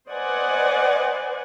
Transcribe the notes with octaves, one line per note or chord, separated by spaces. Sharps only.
B4 C5 D5 D#5 F#5 G#5